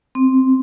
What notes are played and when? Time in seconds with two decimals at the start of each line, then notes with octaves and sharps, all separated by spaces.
0.15 C4